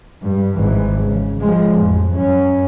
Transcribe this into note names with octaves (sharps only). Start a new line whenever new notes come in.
G2
G#1 E3
C#3
F3 G#3
A1 F2
F#2 C#4